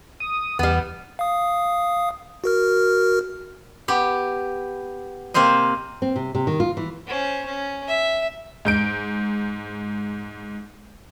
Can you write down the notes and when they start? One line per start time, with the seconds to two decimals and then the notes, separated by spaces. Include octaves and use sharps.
0.20 D#6
0.59 E2 G3 B3
1.19 F5 D#6
2.44 F#4 A#4 F6
3.88 B3 G4
5.34 C3 A#3 C4 C5 D#5
6.02 C4
6.16 C3
6.35 C3
6.47 D#3
6.60 F4
6.77 E3
7.07 C#4 C5
7.46 C#4
7.88 E5
8.65 G#2 G6 D7